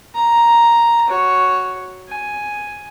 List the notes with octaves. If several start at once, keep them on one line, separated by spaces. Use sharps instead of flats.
A#5
F#4 C#5
G#5